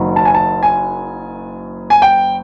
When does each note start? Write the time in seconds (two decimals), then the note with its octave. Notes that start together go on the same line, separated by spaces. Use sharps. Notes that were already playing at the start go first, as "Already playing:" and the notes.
Already playing: F#1 D#3 F#3
0.16 A5
0.25 G#5
0.34 A5
0.63 G#5
1.90 G#5
2.02 G5